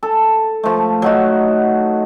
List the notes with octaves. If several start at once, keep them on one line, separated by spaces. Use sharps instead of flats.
A4
F3 A3
F#3 D#4 F#4